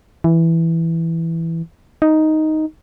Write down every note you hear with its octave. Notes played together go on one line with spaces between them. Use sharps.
E3
D#4